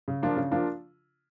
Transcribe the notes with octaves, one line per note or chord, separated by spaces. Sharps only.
C#3
F3 A#3 D4 F4
C#3
F3 A#3 D4 F4